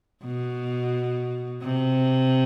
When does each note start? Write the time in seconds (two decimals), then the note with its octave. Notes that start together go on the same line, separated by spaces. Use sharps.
0.25 B2
1.63 C3